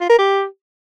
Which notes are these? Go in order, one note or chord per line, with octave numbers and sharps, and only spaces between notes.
F4
A#4
G4